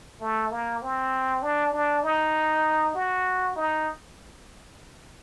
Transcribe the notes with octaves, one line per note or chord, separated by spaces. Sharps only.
A3
A#3
C4
D4
D4
D#4
F#4
D#4